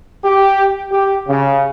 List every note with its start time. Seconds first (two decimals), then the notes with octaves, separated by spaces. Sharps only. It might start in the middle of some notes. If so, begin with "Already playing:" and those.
0.25 G4
0.92 G4
1.28 C#3